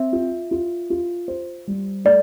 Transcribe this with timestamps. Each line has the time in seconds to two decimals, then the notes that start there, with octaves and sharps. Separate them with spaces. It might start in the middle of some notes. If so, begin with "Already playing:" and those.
Already playing: C4 E5
0.13 F4
0.51 F4
0.90 F4
1.28 C5
1.67 G3
2.05 A3 D5